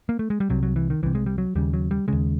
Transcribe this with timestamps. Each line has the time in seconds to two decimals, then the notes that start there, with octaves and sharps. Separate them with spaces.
0.09 A#3
0.19 A3
0.30 G#3
0.40 G3
0.49 C2 C3 F#3
0.63 F#3
0.76 E3
0.90 D#3
1.03 C2 C3 E3
1.15 G#3
1.26 G3
1.38 F#3
1.55 D#2 C#3 G3
1.73 F#3
1.91 G3
2.08 D#2 C#3 G#3